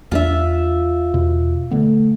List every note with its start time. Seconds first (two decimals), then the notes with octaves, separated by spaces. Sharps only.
0.12 E2 A3 D4 F4 E5
1.14 E2 B2
1.71 D3 A3 B3